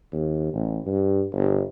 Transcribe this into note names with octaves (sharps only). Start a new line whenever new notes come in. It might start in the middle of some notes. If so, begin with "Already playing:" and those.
D#2
A1
G2
G1